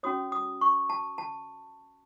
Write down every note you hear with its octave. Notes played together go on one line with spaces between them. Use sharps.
C#4 F#4 C#5 D#6
D#6
C#6
A5
A5